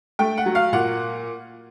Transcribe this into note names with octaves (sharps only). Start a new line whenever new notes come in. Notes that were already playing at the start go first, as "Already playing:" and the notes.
A3 G5
F#5
F#3
F5
A#2 F#5